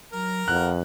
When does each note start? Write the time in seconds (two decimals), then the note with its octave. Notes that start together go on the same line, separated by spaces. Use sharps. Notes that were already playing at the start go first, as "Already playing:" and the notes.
0.13 F#3 A#4 A#5
0.48 F2 F#5 F#6